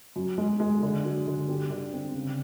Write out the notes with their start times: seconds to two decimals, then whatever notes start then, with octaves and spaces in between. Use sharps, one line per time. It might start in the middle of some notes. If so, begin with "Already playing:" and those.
0.16 F#2
0.38 G#3
0.60 G#3
0.83 D3
1.04 F#3
1.27 D3
1.49 G3
1.70 D3
1.93 C4
2.15 C#3